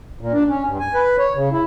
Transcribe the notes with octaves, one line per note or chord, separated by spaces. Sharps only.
A#2
D4
C#4
G2
G#5
B4
C#5
C#3
E4